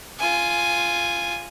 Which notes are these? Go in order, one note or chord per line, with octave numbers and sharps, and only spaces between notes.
F4 G#5